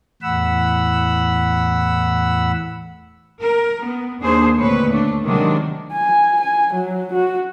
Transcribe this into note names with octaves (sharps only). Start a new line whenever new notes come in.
E2 A2 F#5 B5 E6
A#4
B3
D#2 D4 G#4 C5
D2 A#2 C4 B4 C#5
A3 D4
C3 D#3 F#3 G#3 D4
G#5
G#5
F#3
F#4